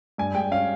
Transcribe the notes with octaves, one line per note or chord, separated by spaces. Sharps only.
G2 G#5
G#3 G5
C#4 F5